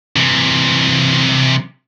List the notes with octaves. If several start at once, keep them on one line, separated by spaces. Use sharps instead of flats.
C3 E3